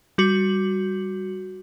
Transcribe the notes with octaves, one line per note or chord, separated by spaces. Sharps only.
G3 F#4